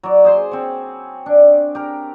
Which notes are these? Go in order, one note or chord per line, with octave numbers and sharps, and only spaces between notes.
F#3 D5
G#4 C5 C6
C4 C#5
D4
G4 A#4